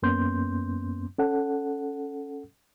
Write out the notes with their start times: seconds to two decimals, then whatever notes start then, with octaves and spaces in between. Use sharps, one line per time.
0.02 F#2 A#3 B3 C#4 C6 G6
1.19 C#4 A4 F#5